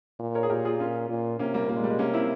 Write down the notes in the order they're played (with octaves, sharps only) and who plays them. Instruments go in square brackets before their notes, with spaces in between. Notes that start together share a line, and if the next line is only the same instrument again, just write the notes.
[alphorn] A#2
[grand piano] A#4 C#5
G#4
[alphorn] A#2 [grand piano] G4 A#4
[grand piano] F4 G#4
C#4 F4
[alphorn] A#2
[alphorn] C3 [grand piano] A#3 C#4
[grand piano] G3 A#3
[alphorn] A#2 [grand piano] A#3
[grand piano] G#3
G3
G#3
[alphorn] C3 [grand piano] A#3 C#4
[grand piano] C4 E4